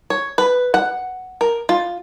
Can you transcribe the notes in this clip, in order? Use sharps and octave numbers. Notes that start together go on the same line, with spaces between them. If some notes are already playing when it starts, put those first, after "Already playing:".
C#5
B4
F#5
A#4
F4